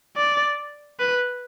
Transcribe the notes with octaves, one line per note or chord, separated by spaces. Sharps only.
D5
B4